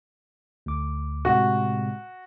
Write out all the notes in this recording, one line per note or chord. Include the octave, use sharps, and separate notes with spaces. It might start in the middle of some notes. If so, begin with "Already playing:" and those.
D2 D6
A2 C3 G#3 F#4